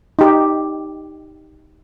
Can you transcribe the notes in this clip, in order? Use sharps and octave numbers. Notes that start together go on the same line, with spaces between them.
D#4 G4